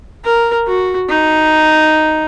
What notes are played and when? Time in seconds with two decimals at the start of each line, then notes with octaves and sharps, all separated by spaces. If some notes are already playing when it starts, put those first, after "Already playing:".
0.25 A#4
0.67 F#4
1.09 D#4